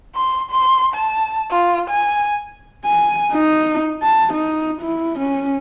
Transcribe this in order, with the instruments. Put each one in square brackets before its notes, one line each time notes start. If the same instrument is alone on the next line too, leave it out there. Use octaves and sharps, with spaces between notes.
[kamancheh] C6
C6
A5
F4
G#5
[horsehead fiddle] G#5
D#4
A5
D#4
E4
C#4